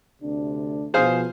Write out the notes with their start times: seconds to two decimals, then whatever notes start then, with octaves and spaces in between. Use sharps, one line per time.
0.22 D2 C3 D4
0.94 B2 F3 G#4 C5 F5